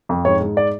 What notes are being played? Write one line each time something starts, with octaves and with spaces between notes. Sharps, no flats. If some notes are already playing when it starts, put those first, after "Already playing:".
F2
G#2 C#5
G#2
D5